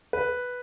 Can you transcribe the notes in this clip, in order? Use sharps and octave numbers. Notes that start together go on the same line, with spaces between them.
B4